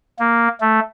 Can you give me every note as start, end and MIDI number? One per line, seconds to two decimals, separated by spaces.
0.19 0.48 58
0.60 0.79 57